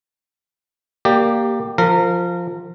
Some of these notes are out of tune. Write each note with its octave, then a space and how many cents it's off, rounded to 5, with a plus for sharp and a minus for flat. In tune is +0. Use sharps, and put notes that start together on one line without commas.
A#3 +0 G4 +0 D5 +25
F3 +0 A#4 -25